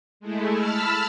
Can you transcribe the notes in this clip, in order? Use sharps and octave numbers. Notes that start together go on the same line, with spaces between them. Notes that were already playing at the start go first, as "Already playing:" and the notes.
G#3 A3 E4
A5 B5 E6 F6